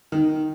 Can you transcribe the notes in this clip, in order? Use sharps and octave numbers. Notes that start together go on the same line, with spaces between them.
D#3